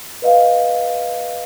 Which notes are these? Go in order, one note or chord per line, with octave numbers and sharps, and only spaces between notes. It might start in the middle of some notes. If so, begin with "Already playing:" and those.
B4 D#5 F5